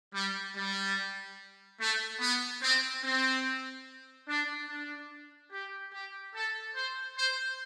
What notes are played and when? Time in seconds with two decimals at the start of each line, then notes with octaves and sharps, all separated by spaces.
0.14 G3
0.56 G3
1.80 A3
2.20 B3
2.62 C4
3.04 C4
4.28 D4
4.68 D4
5.52 G4
5.93 G4
6.35 A4
6.75 C5
7.17 C5